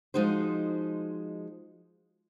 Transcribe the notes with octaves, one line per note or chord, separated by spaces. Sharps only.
F3 G#3 D#4 F#4 C5